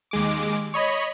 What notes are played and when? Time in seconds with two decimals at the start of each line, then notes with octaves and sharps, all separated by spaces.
0.11 D#2 G#3 D6
0.74 C#5 D#5 B5